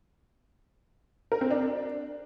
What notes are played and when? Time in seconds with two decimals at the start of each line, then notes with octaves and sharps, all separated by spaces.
1.32 A#4
1.41 C4
1.51 D4